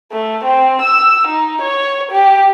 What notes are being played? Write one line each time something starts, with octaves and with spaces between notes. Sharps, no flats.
A3
C4
E6
D#4
C#5
G4